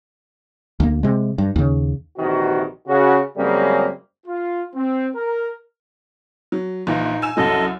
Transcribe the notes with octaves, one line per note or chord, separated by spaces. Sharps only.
D2 A#3
C3 G#3
G2
D#2 C#3
A#1 C3 D#3 E3 F#4
C#3 F#4
F#2 C#3 G3 G#3 A#3 C4
F4
C4
A#4
F#3
A#1 A#2 E3 D#4
G#5 E6 E7
C2 F#2 F#3 A4 D#5